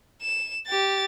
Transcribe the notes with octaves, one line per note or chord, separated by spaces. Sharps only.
E7
G4 A6